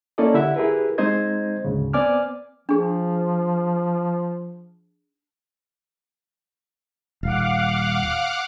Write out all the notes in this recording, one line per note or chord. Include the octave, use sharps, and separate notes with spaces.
A#3 C#4 E4 A4 D5 D#5
D3 E4 G4 E5 F#5
E4 G4 G#4 A#4 B4
G#3 C4 D#4 C5 D#5 G#6
D2 G#2 C#3
B3 C4 D5 G#5 D6 F6
F3 D4 G#4
D#1 F5 F#5 D6